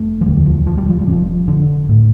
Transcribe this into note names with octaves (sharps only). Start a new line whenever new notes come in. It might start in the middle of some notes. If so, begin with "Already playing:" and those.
Already playing: F1 F2 A3
F3
E1 D2 D3 G3
E3
F3
F3
G3
F3
G3
F1 F2 C3 F3
D3
A2